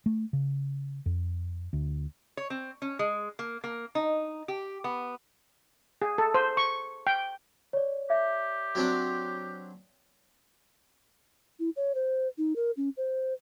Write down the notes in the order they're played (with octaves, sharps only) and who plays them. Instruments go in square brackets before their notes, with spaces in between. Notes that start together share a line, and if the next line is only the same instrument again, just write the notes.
[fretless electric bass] A3
C#3
F2
D2
[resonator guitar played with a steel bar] C#5
C4
C#4
G#3
A#3
A#3
D#4
G4
B3
[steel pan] G#4
A4
C5
C#6
G5
[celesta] C#5 D5
[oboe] G4 [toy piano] E5
[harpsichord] F#3 C4 D4
[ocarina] E4
C#5
C5
D#4
A#4
C#4
C5